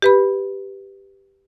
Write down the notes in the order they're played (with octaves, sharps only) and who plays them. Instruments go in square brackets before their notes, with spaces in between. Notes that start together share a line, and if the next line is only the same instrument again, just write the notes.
[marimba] G4 B4 B5